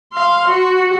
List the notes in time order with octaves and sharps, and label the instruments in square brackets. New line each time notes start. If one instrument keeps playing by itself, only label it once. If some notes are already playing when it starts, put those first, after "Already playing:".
[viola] F5 C6
F#4